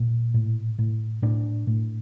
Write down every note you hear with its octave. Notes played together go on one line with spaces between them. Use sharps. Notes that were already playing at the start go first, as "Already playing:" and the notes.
Already playing: A#2
A2
A2
A2 D4
A2